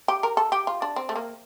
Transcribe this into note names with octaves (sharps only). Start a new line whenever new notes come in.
G4
A#4
A4
G4
F4
D4
C4
A3
A#3